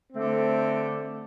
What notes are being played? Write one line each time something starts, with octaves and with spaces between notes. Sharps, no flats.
D3 A3 C4